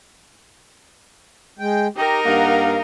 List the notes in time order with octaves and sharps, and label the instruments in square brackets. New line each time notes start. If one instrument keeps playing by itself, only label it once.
[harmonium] G#3 G5
[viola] D#4 A#4 [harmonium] G4
[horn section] G2 A#3 F5 [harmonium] F#5